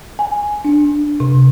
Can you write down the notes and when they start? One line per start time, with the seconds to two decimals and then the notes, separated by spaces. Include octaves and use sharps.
0.19 G#5
0.65 D4
1.20 C3